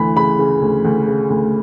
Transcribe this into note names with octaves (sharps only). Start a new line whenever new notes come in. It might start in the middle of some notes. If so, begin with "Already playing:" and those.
Already playing: D2 E3 B5
C#3 B5
C#3
D2
D2
C#3
D2